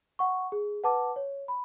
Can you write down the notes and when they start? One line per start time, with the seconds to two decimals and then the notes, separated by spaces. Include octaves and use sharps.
0.19 F#5 C#6
0.52 G#4
0.84 B4 F#5 A5 D6
1.16 C#5
1.48 B5